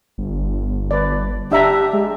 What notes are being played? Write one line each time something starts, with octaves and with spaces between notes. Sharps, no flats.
G1
B4 D5
D4 G4 E5 A#5
G#3